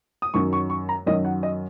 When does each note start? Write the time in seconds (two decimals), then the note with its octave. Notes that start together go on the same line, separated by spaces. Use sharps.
0.22 D#6
0.34 F#2 D#3 F#3 C#6
0.53 C#6
0.70 C#6
0.89 A#5
1.06 F#2 D#3 F#3 D#5
1.25 F#5
1.43 D#5